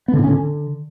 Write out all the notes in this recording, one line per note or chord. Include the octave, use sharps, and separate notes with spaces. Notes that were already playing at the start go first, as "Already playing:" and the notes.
B3
D3
A2
C#4
D3